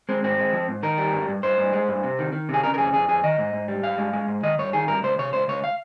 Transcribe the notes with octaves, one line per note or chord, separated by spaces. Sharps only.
G#3 C4
G#2 C4
G#3
F3
G#2
D#3 A#4
G3
G2
G2
G2 C5
G2
G#3
G2
C3
D#3
D#3
C3 G#4
C#3 A#4
A#4
F2 G#4
F2 G#4
F2 G#4
D#3 D#5
G#2
G#2
G3
G#2 F5
G#3
G#3
G#2
D#3 D#5
G2 C#5
D#3 G#4
G2 A#4
C#2 C5
C3 C#5
C#2 C5
C#2 C#5
F5